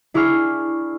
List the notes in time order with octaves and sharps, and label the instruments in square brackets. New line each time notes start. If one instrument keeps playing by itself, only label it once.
[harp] D4 E4 G#4 C#6 F6 C7